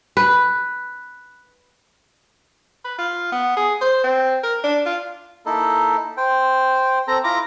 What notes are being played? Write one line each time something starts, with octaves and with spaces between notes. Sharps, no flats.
B4
B4
F4
B3
G#4
C5
C4
A#4
D4
F4
A#3 D#4 E4 A4
C5 G5
C4 A4 A#5
E4 F4 A#5 D6